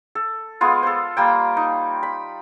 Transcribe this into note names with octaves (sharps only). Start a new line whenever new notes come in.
A4
G#3 B3 F4
A4 C5
G3 A#3 G5
D#4
B5